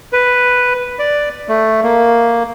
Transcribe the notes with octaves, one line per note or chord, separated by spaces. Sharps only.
B4
D5
A3
A#3